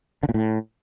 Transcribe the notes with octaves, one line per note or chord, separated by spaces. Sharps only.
D3
A#2
A2